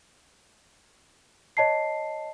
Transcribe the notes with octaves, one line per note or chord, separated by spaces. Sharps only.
C#5 D#5 A5 C7